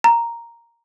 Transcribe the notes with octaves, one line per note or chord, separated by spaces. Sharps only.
A#5